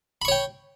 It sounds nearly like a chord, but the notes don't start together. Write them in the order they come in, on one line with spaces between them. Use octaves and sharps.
B5 C#6 C#5 G5